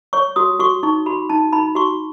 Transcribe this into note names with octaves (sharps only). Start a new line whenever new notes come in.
C#5 C#6
F#4 D#6
F#4 C#6
D#4 C#6
F#4 B5
D#4 A5
D#4 B5
F#4 C#6